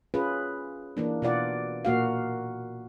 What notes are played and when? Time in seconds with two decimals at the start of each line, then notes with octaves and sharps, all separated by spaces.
0.14 C#4 F4 G#4 B4
0.97 E3 A#3 D4
1.22 B2 F4 D5 F#5
1.85 A#2 A#3 F#4 F5